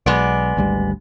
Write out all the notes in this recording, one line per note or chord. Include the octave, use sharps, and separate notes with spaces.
B1 G#3 B3 D5
G#1 D2 G3